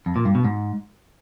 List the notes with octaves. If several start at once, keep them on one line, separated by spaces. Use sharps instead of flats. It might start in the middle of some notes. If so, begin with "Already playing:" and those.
F2
A#2
G2
B2
G#2